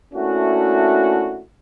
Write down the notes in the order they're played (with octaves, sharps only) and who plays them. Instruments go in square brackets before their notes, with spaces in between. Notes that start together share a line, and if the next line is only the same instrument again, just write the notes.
[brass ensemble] A3 A#3 C#4 D4 E4 F#4